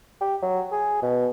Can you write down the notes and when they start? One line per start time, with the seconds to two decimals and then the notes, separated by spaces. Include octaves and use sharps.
0.21 G4
0.42 F#3
0.72 G#4
1.02 B2